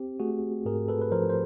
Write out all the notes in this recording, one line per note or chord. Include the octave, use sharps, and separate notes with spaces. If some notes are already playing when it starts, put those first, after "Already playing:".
Already playing: C4 G4
A3 F#4 G#4
G#2 G#4 A#4
A4 B4
B4
F3 A#4 C5
C5